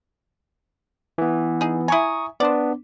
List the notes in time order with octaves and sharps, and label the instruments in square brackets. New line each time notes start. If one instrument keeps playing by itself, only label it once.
[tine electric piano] E3 B3
[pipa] D#4 G#4
[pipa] E4 G#5 [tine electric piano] A#5 C#6 D#6
[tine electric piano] B3 D4 [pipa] C5 D5